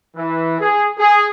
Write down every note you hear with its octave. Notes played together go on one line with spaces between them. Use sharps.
E3
G#4
G#4